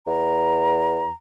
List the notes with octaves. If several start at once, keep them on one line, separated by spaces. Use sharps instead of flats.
E2 A#5